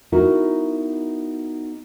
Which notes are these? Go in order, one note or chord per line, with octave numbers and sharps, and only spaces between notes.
B3 D#4 E4 F#4 A#4